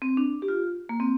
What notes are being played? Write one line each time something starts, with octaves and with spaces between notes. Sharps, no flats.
C4
D4
G4
F4
A#3
C4